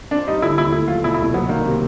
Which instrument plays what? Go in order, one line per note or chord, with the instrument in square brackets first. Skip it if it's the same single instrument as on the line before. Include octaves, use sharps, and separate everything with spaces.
[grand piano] C4 [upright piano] D4
[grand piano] G3 [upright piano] D#4
[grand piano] D3 [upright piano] E4
[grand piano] D#2 [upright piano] E4
[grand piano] A3 [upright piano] E4
[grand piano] F#3 [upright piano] F4
[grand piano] B2 [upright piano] E4
[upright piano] E4
[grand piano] C2
[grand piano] F#3 [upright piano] B3
[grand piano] D#3 [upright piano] A#3
[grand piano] C3